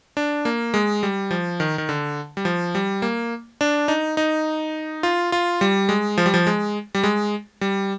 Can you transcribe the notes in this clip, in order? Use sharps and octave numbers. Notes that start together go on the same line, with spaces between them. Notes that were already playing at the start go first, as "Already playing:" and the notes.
D4
A#3
G#3
G3
F3
D#3
D#3
D3
G3
F3
G3
A#3
D4
D#4
D#4
F4
F4
G3
G#3
F3
G3
F3
G#3
G3
G#3
G3